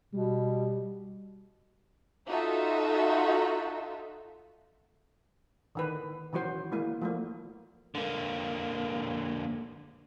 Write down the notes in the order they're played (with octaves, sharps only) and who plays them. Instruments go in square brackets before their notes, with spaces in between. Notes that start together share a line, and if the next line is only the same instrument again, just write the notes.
[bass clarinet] B2 [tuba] G3
[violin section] D#4 F4 F#4 A4 E5
[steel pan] D3 D#3 B4
D#3 E3 F#3 F#4 C5
G#3 A#3 E4
F3 A3 A#3
[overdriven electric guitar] D3 A#3